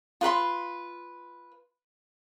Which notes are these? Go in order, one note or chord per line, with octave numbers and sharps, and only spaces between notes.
F4 B4 B5 C6